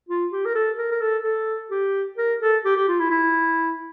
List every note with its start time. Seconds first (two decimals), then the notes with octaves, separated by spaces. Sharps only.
0.09 F4
0.32 G4
0.45 A#4
0.55 A4
0.78 A#4
0.91 A#4
1.01 A4
1.24 A4
1.71 G4
2.17 A#4
2.41 A4
2.65 G4
2.76 G4
2.88 F4
3.00 E4
3.10 E4